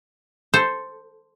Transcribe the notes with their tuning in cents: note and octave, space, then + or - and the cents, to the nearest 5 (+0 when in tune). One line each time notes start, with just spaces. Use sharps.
A4 +0 C5 +0